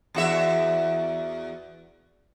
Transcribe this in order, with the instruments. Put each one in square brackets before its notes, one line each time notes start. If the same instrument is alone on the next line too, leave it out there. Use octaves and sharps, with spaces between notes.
[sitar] E2 F#4 E5